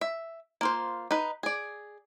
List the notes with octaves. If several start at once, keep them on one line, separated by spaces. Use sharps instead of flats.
E5
A#3 F4 C5
D#4 B4
G#4 D5